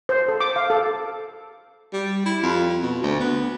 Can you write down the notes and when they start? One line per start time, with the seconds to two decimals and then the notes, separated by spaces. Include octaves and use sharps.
0.09 C5
0.28 A4
0.40 D6
0.56 F5
0.70 A4
1.93 G3
2.25 E4
2.42 F2
2.82 B2
3.02 D2
3.20 B3